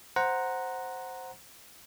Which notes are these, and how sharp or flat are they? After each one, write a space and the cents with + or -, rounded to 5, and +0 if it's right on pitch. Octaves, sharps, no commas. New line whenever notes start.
C5 +0 F#5 +0 A#5 +0